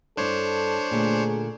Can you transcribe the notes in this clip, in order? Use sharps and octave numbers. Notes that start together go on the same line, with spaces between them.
G2 D4 E4 A4 C5 C#5
A#2 D3 A3 G#4